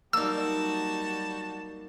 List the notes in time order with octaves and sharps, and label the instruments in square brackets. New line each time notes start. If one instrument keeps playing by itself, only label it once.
[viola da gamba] F#3 G3 [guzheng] A#3 D#4 [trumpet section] F#4 A5 [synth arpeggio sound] E6